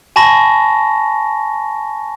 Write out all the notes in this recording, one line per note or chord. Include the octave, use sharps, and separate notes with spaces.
G#5 A5 B5 C#6 A#6